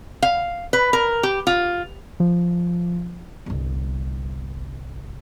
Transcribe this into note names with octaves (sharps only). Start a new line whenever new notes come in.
F5
B4
A#4
G4
F4
F3
G1 C2